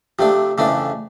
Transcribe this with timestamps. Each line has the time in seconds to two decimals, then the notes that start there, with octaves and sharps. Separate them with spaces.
0.19 C3 F3 A3 D4
0.58 F2 C#3 E3 A3 D4